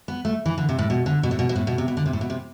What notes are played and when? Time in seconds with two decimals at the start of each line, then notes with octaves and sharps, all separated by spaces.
0.08 B3
0.25 A3
0.46 E3
0.58 D3
0.69 C3
0.79 A2
0.90 B2
1.06 D3
1.23 B2
1.31 A2
1.39 B2
1.49 B2
1.56 A2
1.67 B2
1.78 C3
1.88 B2
1.97 D3
2.06 C3
2.13 A2
2.21 B2
2.30 C3